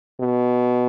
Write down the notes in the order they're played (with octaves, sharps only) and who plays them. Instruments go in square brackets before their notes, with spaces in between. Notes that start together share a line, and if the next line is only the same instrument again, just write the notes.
[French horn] B2